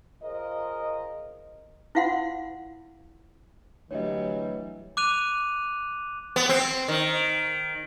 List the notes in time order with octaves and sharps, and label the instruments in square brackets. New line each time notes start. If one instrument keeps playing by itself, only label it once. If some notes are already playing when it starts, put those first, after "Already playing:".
[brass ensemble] F4 G#4 A#4 C5 D#5
[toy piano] E4 F4 F5 F#5 C6
[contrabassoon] D2 [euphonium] E3 [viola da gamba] F#3 G3 [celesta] C#5 D#5
[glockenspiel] D6 F#6 D#7 F7
[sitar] B3
C4
D#3